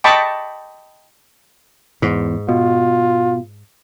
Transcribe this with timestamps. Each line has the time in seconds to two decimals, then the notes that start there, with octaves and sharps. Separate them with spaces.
0.04 D#5 G5 A5 B5 C#6 D6
2.02 E2 G#2
2.49 B2 F4